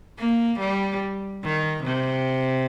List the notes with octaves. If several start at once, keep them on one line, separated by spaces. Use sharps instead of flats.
A#3
G3
D#3
C3